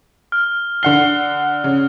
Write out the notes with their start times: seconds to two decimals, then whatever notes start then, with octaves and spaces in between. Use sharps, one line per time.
0.32 F6
0.83 D3 F#5 C7 G7
1.64 C#3